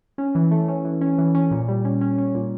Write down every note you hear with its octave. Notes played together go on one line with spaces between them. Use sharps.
C#4
E3
A3
C#4
E3
C#4
E3
C#4
A#2
G3
C#4
C#4
C#4
A#2